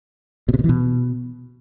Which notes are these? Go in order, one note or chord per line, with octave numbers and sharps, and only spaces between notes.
B2
C3
B2
E3
B2